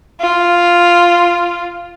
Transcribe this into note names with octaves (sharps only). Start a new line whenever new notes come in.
F4